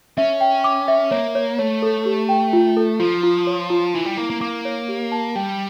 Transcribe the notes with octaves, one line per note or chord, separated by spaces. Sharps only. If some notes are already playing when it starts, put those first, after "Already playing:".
C#4 E5
G5
D6
E5
A#3 C#5
C#5
A3 C#5
A4
G4
G5
F4
A4
F3 F4
F4
C#5
F4
E3 E4
G3
A#3 E4
A#3
A#3 D6
C#5
G4
A5
G3 G5